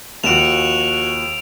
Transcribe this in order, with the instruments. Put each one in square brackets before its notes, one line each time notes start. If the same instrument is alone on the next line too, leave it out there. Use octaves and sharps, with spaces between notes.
[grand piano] D#2 F3 [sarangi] F#4 [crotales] D7 E7 F7